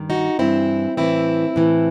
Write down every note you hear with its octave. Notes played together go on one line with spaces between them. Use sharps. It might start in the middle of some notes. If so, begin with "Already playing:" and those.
Already playing: G2 D#3
D#4 F#4
G2 E3 C4 E4
A2 E3 C4 E4
A2 E3